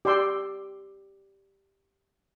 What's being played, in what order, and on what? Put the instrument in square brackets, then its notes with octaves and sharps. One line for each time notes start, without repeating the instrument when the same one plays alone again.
[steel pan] G4 D5 G5 C6 E6